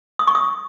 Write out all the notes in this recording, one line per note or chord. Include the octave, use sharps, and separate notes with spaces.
D#6
C#6
D#6